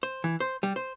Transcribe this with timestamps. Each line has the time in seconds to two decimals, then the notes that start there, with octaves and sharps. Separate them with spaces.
0.03 C5
0.24 E3
0.40 C5
0.63 G3
0.76 C5